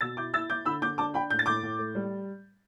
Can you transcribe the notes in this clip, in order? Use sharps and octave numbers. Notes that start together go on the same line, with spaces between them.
B2 E6 A6
E4 D6 G6
E4 E6 A6
E4 D6 G6
D3 B5 E6
D3 D6 G6
D4 A5 D6
D4 G5 B5
A2 G6
A6
A2 D6 G6
A2
A3
G3